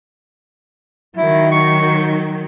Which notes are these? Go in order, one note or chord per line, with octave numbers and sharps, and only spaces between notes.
D#3 F#3 E4
C#6